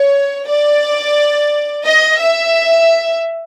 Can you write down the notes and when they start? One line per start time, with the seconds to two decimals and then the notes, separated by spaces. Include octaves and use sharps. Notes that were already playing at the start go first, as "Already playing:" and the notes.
Already playing: C#5
0.48 D5
1.87 D#5
2.21 E5